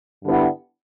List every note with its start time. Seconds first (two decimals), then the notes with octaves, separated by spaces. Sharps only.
0.24 G2 D3 G3 B3 E4